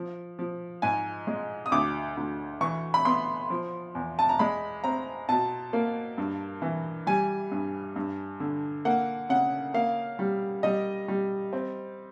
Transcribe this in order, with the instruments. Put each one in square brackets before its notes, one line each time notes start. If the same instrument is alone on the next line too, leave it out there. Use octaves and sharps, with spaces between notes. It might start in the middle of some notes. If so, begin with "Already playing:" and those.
Already playing: [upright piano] F3
F3
G#2 G#5
G#3
D#6
D2 D6
D2
E3 C#6
B5
B3 C6
F3
E2
A5
A#5
G#3 B5
C4 A#5
B2 A5
A#3
G2
E3
G3 G#5
G2
G2
D3
A#3 F#5
C#3 F#5
A#3 F5
G3
G3 D#5
G3
C4